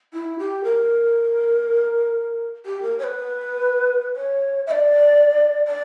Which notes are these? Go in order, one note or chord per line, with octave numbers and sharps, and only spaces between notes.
E4
G4
A#4
G4
A#4
C#5
B4
C#5
E5
D5
D5